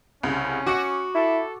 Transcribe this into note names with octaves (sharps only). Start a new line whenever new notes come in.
C2 C#3 C#4
F#4 D6 C#7
E4 A4